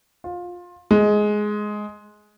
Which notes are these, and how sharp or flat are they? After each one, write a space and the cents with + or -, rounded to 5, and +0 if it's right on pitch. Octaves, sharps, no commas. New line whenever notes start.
F4 +20
G#3 +10